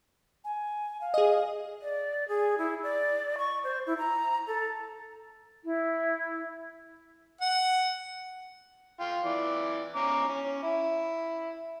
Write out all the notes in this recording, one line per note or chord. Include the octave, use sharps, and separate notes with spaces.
G#5
F5
G#4 D#5
D5
G#4
E4
D5
C#6
C5
E4
A#5
A4
E4
F#5
F4 G5
E3 D5
C#4 A#5 D6
C#4
E4